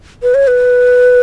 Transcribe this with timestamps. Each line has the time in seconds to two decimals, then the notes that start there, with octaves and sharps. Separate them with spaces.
0.23 B4
0.35 C#5
0.47 B4